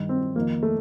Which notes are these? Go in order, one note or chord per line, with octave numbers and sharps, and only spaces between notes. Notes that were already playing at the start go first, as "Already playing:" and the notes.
Already playing: G2 D#3
C4
F2 D#3 A#3
A3